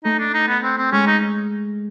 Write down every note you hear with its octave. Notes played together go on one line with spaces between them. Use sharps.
A3 D#4
D4
D#4
B3
C4
C4
G#3 C#4
D#4